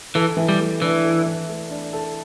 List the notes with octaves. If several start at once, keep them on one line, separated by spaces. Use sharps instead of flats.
E3 A4
E3
G3
A3
E3 D4
A4
E3
A3
D4
A4